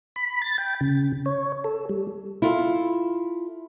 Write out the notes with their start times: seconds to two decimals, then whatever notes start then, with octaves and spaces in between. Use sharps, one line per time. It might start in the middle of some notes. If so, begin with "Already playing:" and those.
0.16 B5
0.42 A6
0.58 G5
0.81 C#3
1.26 C#5
1.64 A4
1.89 G3
2.42 E4 F4 A4